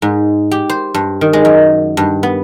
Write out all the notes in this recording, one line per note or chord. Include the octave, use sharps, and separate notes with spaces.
G#2
G4
C5
G2
D#3
G#3
F#2
G2
B3